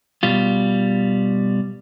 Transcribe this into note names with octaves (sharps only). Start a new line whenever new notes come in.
B2 G3 F4